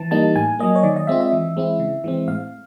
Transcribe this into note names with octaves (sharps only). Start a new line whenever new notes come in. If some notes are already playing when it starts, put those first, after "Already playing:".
Already playing: E3 A5
G3 A#3 D#4 A5
A2 G#5
F#3 A#3 D#5
C#5
D#3 D5
D#5
G#3 C4 F4 E5
E5
E3
G#3 C4 E4
C#3
E3 G#3 C4
A2 F5